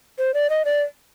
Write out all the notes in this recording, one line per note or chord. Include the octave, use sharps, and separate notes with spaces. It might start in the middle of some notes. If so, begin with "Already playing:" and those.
C5
D5
D#5
D5